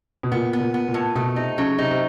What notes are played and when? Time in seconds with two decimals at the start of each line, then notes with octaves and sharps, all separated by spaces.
0.23 B2
0.32 A#2 B3
0.53 B3
0.60 A#2
0.74 B3
0.88 A#2
0.94 A2
1.15 B2 A3
1.36 C3 D#4
1.58 C#3 F#3
1.78 C3 D#4
1.91 C3